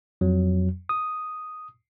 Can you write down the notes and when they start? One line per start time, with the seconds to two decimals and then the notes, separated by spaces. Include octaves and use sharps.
0.21 F2 F#3
0.89 D#6